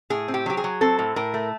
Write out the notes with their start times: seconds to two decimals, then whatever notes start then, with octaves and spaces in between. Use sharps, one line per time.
0.10 A2 G#4
0.28 C4
0.34 G4
0.46 F#3 G4
0.57 G#4
0.64 F#3
0.81 C4 A4
0.99 A2
1.16 A2 A#4
1.34 A3